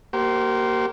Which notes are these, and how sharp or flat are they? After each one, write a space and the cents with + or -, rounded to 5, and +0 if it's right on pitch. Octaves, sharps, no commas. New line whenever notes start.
A#3 +0 G4 -40 C5 +0